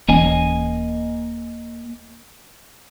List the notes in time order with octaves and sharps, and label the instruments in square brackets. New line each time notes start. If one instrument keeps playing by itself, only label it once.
[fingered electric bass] D#1 E3 C#4 [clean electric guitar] A#3 D#5 G#5